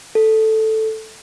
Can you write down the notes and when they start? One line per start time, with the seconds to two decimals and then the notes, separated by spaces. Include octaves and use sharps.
0.15 A4